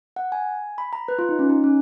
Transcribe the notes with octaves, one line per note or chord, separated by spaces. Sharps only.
F#5
G#5
B5
A#5
B4
F4
D#4
C#4
D#4
C#4